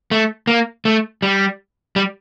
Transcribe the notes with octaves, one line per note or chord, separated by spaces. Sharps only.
A3
A#3
A3
G3
G3